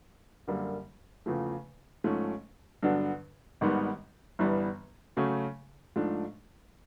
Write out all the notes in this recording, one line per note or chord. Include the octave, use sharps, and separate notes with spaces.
F#2 D3 G3 A#3
E2 C#3 F3 A3
G#2 F3 A3 C#4
G2 D3 F#3 B3 D4
G#1 G#2 D#3 G3 B3
G1 G2 E3 G3 B3
C#3 F#3 A3 C#4
G#2 F3 A3 D4